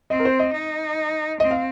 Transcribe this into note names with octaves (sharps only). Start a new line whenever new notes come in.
C4 D#5
A#4
C5
D#5
D#4
C4 D#5
F5